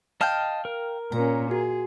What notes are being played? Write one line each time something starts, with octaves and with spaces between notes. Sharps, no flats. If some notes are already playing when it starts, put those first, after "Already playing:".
D#5 F5 G5 A5 F6
A#4
A#2 C#4 A#5
F#4 G#4